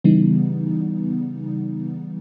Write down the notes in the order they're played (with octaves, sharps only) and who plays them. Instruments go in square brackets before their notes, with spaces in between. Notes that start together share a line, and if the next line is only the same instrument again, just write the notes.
[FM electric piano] C#3 E3 G3 B3 D#4